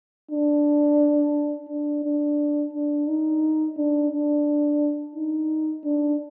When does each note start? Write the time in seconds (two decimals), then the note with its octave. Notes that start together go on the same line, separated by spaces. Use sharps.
0.31 D4
1.69 D4
2.04 D4
2.73 D4
3.08 D#4
3.77 D4
4.11 D4
5.15 D#4
5.84 D4